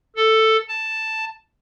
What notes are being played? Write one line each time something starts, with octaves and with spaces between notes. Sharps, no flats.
A4
A5